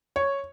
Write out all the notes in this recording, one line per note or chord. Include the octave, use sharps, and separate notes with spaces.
C#5